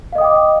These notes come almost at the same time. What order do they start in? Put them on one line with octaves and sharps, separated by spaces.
F5 D#5 D#6 G5 D6